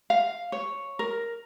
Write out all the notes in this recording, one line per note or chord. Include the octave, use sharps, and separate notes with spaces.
F5
C#5
A#4